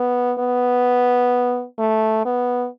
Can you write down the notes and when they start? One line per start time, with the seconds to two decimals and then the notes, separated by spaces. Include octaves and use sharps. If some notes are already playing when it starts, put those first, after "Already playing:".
Already playing: B3
0.39 B3
1.79 A3
2.25 B3